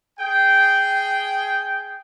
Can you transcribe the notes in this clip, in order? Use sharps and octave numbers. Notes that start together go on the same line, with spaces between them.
G#4 G5